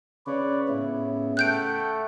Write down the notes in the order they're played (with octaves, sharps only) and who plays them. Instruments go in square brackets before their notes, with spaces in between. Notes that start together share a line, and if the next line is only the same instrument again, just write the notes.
[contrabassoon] C#3 [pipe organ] B4 C#5 D5
[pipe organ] A2 B3 E4 [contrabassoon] C#3
[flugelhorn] A3 [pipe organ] F#5 G5 [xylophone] F#6 G6 D7